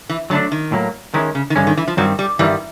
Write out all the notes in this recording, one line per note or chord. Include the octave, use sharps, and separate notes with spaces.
E3
D3 F#3 A3 D4
D#3
A2 F#3 A#3
D#3 E3 G#3 C#4
C#3
D#3
G2 D3 E3 G#3 C#4
D#3
E3
F3
G2 D#3 F#3 G3 C4
G3
G2 D#3 E3 G3 B3